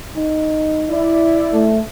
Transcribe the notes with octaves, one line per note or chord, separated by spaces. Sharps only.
D#4
E4 D5
A3